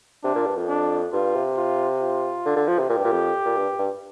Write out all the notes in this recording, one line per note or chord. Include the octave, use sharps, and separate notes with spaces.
C3 D4
A#2
G2
F2
D4
G2 F4
C3
F4
F4
D3
D3
F3
C3
A#2 G4
G2
A#2
F2
A#2
G2
G2